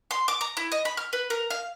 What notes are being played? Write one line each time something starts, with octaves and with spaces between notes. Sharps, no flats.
C6
D6
A#5
E4
D#5
B5
F6
B4
A#4
F5